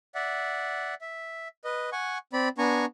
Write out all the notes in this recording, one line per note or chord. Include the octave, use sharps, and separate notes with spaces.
D5 E5 F#5
E5
B4 D#5
F#5 G#5 C#6
C4 D5 B5
B3 D4 G#5 A#5 C#6